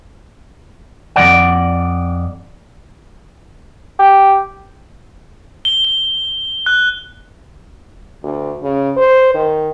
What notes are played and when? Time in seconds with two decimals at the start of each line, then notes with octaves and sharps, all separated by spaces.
1.16 F2 C#3 D5 F#5
3.99 G4
5.65 G7
5.85 G7
6.66 F#6
8.23 D2
8.62 C#3
8.97 C5
9.34 D#3